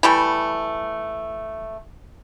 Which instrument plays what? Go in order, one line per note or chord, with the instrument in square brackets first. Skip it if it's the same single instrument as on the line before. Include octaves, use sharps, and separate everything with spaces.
[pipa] E3 G3 A3